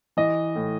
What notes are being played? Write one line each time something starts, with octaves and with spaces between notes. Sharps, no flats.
E3 D#5
A2